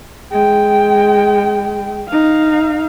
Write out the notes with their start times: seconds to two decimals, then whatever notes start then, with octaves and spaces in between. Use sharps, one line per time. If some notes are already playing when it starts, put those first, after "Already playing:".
0.32 G#3 G5
2.09 D#4 F5